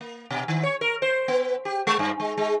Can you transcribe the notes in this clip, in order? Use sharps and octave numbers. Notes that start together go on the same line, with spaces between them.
A#3
B2
D#3
C#5
A#4
C5
B3
G4
G#3
G2
G#3
G#3